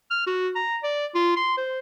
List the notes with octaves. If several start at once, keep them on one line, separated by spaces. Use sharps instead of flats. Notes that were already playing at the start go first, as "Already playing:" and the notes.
F6
F#4
A#5
D5
F4
C6
C5